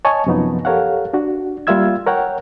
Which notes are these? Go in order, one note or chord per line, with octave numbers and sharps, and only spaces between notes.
C#5 D#5 G#5 A5 C#6
F#2 C3 F3 B3 D#4
G4 A4 A#4 C#5 F5 F#5
D4 F#4
G3 A#3 F4 E5 E6 G#6
A#4 C#5 F#5 G5